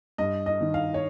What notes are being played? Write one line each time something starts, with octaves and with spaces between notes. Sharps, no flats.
G2 D#5
D#5
D#3
F5
C#5